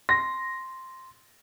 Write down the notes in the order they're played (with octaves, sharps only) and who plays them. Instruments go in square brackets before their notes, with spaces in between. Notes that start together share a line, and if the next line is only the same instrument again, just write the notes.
[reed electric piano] C6 [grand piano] A#6